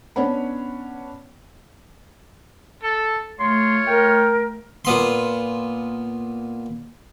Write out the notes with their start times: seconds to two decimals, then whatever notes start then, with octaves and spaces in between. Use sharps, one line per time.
0.16 B3 C#4 D4 C#5 F#5 B5
2.83 A4
3.40 A3 F4 C#5 C6
3.87 A#4 G5
4.85 A#2 B3 C6